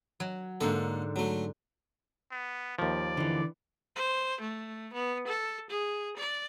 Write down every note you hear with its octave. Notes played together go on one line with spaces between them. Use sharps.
F#3
G#2 D3 A#3 A4
F#3 A3
B3
D#2 F3 D5
D3 E3
C5
A3
B3
A4
G#4
D5